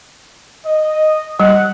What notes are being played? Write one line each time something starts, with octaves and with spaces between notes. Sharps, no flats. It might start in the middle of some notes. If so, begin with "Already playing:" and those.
D#5
G3 F#5